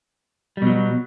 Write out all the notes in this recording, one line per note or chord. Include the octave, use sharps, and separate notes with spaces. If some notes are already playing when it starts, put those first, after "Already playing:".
B2 F#3 G3